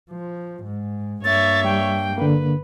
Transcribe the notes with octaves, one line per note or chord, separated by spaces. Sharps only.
F3
G#2
G2 A#3 C#5 E5 A6
G3 G5
D3 A#3 B4